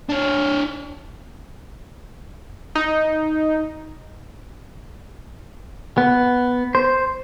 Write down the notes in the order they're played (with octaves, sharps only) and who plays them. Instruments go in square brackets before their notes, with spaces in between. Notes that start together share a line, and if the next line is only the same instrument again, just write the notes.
[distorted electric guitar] D4 C#5
[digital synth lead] D#4
[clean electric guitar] B3
C5